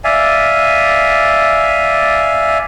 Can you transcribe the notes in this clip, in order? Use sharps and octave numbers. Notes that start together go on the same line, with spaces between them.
D5 E5 F5 G#5